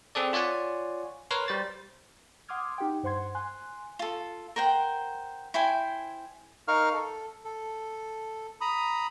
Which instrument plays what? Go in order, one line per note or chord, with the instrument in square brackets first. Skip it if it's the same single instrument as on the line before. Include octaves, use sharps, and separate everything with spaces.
[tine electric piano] C4 G#4 A4 D5
F4 C#5 D5 F#5 G#5
A#4 B4 C#5 C6
G3 C5 A6
[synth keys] F#5 C6 D6 D#6 F6 G#6
D#4 G4 F#5 G5
G2 C5 F#5 C6 G#6
G#5 C6 F#6
[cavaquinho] F4 A4
A#4 C5 F#5 G5
E4 C5 G5 G#5
[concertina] D#4 A#4 F5 C#6 F6
A4
A4
A#5 B5 D#6